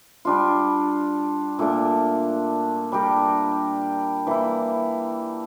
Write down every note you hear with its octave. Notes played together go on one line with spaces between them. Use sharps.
G3 D4 F4
A#2 A3 D4
G3 D4 G4 A#4
E3 A#3 E4